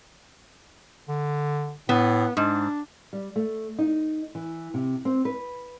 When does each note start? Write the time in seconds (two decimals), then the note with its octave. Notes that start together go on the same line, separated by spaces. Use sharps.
1.09 D3
1.89 A2 B3
2.37 G#2 D4
3.13 G3
3.36 A3
3.79 D#4
4.35 E3
4.74 C3
5.05 C4
5.25 B4